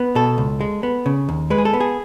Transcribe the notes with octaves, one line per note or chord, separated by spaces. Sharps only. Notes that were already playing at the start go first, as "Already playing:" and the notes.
Already playing: B3
B2 A4
C#2
G#3
B3
C#3
D#2
G#3 B4
G#4
A4
B3
G#4